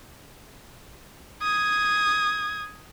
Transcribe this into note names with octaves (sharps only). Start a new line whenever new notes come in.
D#6 G#6